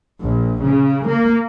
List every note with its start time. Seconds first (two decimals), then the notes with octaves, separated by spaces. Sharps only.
0.22 A#1
0.62 C#3
1.05 A#3